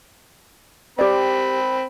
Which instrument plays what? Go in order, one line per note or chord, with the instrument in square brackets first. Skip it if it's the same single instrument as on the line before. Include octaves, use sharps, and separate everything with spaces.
[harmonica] C4 B5 [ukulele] G4 D5